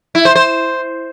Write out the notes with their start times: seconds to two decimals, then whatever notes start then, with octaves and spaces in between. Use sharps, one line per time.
0.15 E4
0.25 C5
0.35 C5